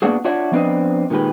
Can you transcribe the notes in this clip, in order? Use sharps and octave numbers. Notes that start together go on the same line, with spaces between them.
A2 A#3 B3 D4 F#4 G#4
D4 F4 F#4 C#5 E5
F3 B3 C4 D4 B4 D#5
A#2 D#3 G#3 G4 B4